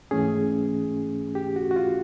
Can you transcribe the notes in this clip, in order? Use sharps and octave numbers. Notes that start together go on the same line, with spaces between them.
G#2 E3 A3 C#4 G#4
G4
F#4
F#4
F4